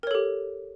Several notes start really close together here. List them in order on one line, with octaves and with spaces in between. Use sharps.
A#4 C#5 A4 G4